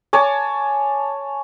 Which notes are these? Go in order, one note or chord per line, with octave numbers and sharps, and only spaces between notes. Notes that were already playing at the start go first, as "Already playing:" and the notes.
C#5 G#5 A5 D6